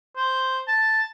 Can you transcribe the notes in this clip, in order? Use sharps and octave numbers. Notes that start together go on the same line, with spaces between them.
C5
A5